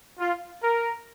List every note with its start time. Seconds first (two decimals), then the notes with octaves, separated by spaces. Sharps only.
0.19 F4
0.63 A#4